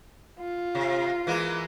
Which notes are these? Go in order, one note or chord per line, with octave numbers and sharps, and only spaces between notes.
F4
C3
E3 G#3 A#3